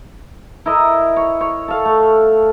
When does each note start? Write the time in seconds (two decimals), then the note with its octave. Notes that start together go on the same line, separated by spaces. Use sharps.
0.66 E4 A#4 D#5
1.16 C#5
1.41 C#5
1.68 A4 F5
1.85 A3